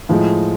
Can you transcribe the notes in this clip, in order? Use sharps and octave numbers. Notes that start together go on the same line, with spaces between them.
A2 F3 G#3